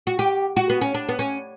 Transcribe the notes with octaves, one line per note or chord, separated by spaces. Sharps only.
F#4
G4
F#4
B3
C#4
D4
B3
C#4